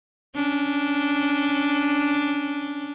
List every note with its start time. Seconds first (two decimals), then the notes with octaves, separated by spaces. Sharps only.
0.36 C#4 D4